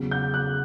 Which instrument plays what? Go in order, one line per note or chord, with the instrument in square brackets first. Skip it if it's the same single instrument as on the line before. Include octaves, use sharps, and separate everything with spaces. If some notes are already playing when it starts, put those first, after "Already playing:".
Already playing: [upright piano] E2 C#3 F#3
G6
F#6